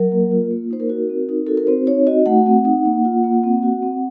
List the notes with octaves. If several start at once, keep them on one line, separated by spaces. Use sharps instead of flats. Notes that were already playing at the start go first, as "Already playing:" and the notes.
Already playing: F#3 A#4
A#3
F4
A#3
D#4 C5
A#4
F#4
C4
D#4
F#4 A4
A#4
C4 C5
D#4 C#5
F#4 D#5
A3 F#5
C4
D#4
A#3
F4
A#3
C4
F#4
C4